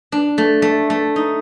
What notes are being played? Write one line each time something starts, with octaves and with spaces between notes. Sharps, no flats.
D4
A3
A3
A3
D#4